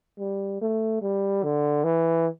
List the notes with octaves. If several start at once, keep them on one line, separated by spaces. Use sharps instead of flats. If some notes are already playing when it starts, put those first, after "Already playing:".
G3
A3
G3
D3
E3